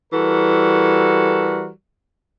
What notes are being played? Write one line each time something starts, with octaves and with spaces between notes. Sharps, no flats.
E3 G3 F#4 A4 A#4